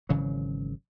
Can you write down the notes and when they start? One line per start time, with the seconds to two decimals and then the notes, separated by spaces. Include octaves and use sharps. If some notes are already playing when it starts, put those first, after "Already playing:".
0.09 G#1 C#3 E3 F#3